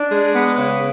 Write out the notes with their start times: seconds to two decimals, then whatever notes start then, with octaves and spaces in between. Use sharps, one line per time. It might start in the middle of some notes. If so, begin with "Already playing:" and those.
Already playing: D4
0.12 G#3
0.34 B3
0.58 C#3